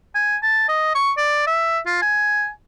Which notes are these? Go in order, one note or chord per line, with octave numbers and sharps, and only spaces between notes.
G#5
A5
D#5
C#6
D5
E5
F4
G#5